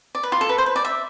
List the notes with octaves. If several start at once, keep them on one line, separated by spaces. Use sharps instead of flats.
D5
B4
F4
A4
B4
C5
B4
D5
E5